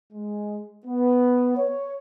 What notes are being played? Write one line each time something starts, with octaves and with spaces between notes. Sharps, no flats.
G#3
B3
C#5